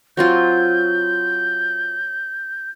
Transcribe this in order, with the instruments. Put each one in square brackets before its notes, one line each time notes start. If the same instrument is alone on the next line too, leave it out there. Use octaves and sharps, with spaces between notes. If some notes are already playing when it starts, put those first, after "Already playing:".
[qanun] F#3 C4 F4 [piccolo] G6